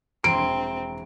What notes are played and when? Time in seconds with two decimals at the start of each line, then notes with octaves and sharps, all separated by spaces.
0.24 E1 E3 C4 A#5 C6 D7